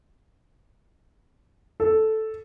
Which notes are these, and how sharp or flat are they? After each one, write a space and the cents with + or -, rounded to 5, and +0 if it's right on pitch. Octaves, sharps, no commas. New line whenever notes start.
A4 -5